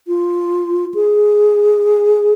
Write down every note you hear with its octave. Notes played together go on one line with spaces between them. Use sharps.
F4
G#4